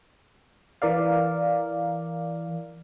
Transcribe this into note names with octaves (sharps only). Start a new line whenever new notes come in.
E3 A#4 D5 F5